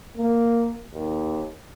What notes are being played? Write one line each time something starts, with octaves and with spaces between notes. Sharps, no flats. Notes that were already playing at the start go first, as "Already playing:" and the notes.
A#3
D#2